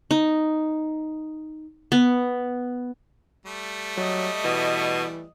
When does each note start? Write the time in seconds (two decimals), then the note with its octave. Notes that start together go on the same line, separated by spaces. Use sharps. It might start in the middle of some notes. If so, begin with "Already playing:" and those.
0.11 D#4
1.92 B3
3.46 G3 A3
3.97 F#3 D#5
4.44 B2 E3